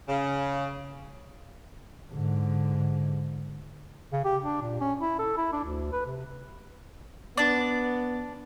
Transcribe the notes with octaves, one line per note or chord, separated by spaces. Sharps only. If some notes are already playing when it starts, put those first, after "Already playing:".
C#3
G#2 D3
C#3
G4
D4
A#2
C#4
E4
A4
E4
D4
D2
B4
C3
B3 D4 D5